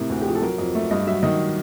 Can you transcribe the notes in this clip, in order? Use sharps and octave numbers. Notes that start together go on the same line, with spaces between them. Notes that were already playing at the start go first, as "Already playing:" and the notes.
Already playing: A2 C3 A#4
D2
G4
F3 G#4
A4
F#3 A#4
F2
A3
G2 D#5
F#3 E5
D#3 D#5